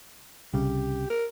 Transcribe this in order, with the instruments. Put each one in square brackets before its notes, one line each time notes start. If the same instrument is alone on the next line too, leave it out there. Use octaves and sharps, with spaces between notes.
[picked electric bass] C2 C#3 [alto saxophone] G4
[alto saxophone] A#4